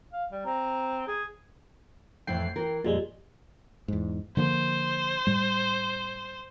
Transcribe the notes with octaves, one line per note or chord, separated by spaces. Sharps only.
F5
G3
C4 A#5
G#4
F2 A2 E3 G5 C7
E3 A#4
F2 A#2 G3 G#3
E2 G#2
D3 F3 A#3 C5
A2 G3